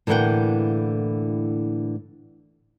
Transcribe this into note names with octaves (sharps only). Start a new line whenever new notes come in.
A2 D3 E3 A#3 F#5 G5